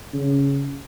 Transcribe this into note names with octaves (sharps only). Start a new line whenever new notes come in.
C#3